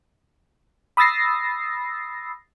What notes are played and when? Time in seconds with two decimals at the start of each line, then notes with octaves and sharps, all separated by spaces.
0.97 B5 D#6 E6 A6 A#6 C7